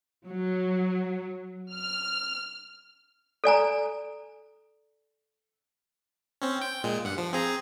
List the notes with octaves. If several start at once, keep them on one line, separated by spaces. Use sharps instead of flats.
F#3
F6
A4 D5 G#5 A#5
C4 C#4
G5
A#2 G#3
G2 F#5
F3
C4 G#4 A#5